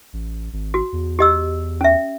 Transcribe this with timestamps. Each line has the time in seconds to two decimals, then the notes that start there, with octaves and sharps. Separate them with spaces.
0.13 A1
0.53 G#1
0.74 F#4
0.93 E2
1.19 G4 D#5 E6
1.81 C#4 E5